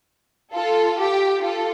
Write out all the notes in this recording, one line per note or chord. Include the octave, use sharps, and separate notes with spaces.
F4 A4
G4
F4 A4